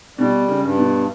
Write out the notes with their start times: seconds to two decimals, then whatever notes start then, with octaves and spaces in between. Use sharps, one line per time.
0.18 B2 G3
0.48 C#3
0.62 G2
0.77 B2